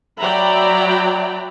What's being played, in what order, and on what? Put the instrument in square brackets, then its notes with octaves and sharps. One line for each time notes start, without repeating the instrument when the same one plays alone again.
[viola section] F#3 D5 E5 G5 A#5 B5